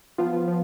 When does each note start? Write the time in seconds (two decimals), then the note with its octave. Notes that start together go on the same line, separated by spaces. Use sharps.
0.18 F3 B3 F4
0.48 F3